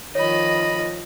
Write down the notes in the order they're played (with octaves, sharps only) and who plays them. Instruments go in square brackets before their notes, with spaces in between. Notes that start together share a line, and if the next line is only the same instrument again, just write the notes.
[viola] D#3 F3 [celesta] C#5 [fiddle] D#5 B5